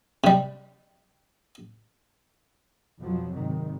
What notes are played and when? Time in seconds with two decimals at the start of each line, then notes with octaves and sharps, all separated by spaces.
0.24 C3 G3
3.00 F2 B2 F3 F#3
3.34 G#1 C3 D#3